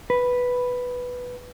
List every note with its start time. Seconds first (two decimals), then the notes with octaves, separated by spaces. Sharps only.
0.10 B4